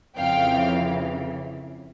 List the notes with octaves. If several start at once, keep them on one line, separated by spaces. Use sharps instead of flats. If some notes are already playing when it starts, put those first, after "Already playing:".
F2 C#3 E3 F5 G5